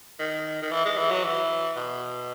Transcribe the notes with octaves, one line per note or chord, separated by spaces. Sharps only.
D#3
D#3
E3
G#3
E3
F#3
E3
B2